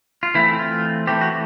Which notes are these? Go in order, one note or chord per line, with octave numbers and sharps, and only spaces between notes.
F4
E3 A3 C4 E4
F4
E3 A3 C4 G4
F#4